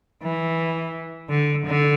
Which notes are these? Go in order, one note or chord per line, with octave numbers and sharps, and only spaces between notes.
E3
D3
D3